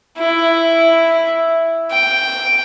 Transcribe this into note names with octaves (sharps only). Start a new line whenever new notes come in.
E4
G5